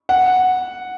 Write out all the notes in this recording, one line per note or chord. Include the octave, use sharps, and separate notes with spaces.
F#5